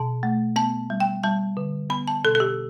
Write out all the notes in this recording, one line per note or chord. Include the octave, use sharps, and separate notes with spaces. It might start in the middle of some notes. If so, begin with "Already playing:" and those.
Already playing: B2 A5
A3
B3 A5
G3
G5
G3 A5
D3
B3 B5
A5
B2 A4
A4
G4